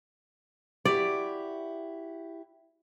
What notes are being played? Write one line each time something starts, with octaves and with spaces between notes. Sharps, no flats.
E4 F#4 G4 D5